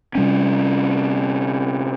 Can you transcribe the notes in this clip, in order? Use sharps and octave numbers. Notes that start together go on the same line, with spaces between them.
C3 G3 C#4